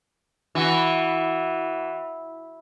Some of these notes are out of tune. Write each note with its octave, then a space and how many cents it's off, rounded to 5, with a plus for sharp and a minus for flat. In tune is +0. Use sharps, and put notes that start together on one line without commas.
E3 -10 F#4 +0